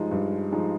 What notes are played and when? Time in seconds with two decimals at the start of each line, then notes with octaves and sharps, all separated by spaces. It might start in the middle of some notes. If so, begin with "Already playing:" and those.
Already playing: G2 F3 G#3 D#4
0.11 G2
0.52 F3 G#3 D#4